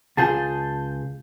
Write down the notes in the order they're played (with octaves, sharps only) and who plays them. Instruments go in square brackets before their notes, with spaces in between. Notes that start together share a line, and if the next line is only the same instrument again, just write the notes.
[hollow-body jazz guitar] C#2 F4 G#4 [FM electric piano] A5 G6